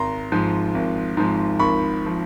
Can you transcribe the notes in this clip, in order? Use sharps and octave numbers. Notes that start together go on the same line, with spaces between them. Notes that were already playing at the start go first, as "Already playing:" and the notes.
Already playing: G#1 A#5 C6
G#2 F3
G#1
G#2 F3
G#1 B5 C#6
F3